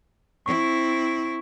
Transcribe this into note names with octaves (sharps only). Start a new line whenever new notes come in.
C4 E4 C#6